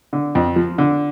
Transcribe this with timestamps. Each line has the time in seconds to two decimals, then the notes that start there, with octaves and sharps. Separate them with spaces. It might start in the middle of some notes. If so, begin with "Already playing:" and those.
0.13 D3
0.35 F2
0.56 F3
0.78 D3